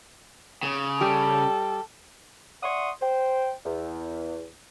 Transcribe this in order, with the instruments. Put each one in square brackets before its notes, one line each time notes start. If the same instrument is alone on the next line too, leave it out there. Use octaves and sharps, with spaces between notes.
[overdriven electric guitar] C#3
[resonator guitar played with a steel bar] G3 G4 [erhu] A4
[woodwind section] D5 E5 F#5 C6 C#6 D#6
C5 G5
E2